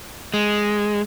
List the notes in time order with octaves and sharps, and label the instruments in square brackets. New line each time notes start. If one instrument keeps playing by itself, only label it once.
[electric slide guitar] G#3